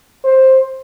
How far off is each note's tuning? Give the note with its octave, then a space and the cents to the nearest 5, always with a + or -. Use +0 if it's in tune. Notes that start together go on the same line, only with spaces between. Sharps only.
C5 +10